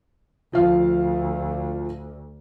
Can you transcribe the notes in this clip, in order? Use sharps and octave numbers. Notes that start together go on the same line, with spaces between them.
D2 F3 F5